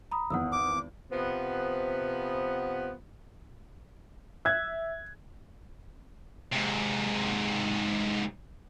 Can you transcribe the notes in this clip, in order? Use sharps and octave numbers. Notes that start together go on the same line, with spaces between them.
A#5 B5 D#6
G#1 E2 F#5 D#6 E6
D6
C3 F3 B3
E5 F#6 G#6
G#2 C3